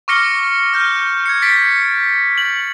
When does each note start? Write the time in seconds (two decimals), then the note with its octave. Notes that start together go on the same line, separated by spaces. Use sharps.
0.08 C#6 D6 F6 A#6 C#7 G7
0.74 F6 G6
1.26 G#6 C#7
1.42 A6 B6 D7
2.38 F#7